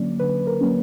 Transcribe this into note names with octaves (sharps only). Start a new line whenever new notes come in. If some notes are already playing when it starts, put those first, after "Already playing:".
Already playing: D3 F#3 A#3 C#4 D5
D3 B4
A#4
F#3 A#3 C#4